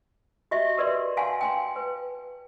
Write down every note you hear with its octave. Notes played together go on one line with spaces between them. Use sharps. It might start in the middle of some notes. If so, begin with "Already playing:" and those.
F#4 G4 D#5 E5
G4 A#4 B4 D5 C6
F5 F#5 G#5 A5 C6
G5 G#5 C6
B4